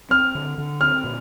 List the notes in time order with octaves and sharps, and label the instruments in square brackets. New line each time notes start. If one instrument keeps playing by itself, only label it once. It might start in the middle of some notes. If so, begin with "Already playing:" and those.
[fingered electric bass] C4 [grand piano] F6
[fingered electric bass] D3
D3
[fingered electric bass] C4 [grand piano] F6
[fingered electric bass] A#2